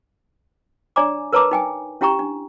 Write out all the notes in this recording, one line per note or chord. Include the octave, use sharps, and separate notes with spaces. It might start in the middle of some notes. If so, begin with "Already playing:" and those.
D4 C#5 D5 G#5 A#5 D6
A#4 B4 C#5 A5 A#5 D6
D#4 G5 G#5
C#4 E4 G4 G5 A#5 C#6
D4